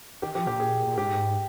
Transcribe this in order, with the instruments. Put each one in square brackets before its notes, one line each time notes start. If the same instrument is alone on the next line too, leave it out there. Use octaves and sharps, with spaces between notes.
[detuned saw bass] D#3 [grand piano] G4
[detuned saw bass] F3 [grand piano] G4
[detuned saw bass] A#2 [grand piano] G4
[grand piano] G#4
[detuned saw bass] A#2
[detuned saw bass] G#2 [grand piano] G4